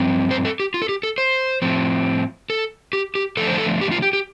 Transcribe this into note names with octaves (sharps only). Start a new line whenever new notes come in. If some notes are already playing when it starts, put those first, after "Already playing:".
Already playing: G2 F3 C4
C5
A4
G4
F4
A4
G4
A4
C5
A2 F3 C4
A4
G4
G4
D3 F3 A3 D4 A4
C5
A4
G4
F4
G4
G4